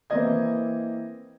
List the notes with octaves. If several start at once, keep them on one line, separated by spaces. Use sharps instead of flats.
E3 A#3 C4 E4 D#5 G#6